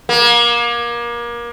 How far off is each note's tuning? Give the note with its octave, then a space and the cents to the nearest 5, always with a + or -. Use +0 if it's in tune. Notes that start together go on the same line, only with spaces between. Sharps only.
A#3 +30